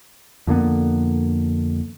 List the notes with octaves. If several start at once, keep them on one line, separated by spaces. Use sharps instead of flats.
F2 D3 A#3 B3